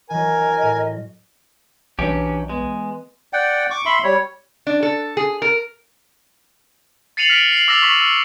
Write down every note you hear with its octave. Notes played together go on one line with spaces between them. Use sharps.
E3 F#3 A#4 D#5 G#5
A2
B1 E3 F#3 C#4 D4 G4
G#3 B3
D5 F#5 G5
C#6 D6
E5 B5 C6
G3 C#5
D4
A4
G#4
A#4
A6 C7 C#7 D#7 F7 F#7
F6 B6 D7
C7 F#7
D6 E6 A6 A#6 E7 F7
C#6 B6 F#7
E6